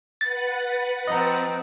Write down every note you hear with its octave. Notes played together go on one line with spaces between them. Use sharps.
B4 F#5 A6
F3 C4 D#5 A#5